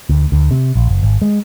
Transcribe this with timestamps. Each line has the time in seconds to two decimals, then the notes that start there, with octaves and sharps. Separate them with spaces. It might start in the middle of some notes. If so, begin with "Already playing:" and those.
0.09 D2
0.32 D2
0.51 C3
0.75 A#1
0.89 F#1
1.03 G#1
1.22 G#3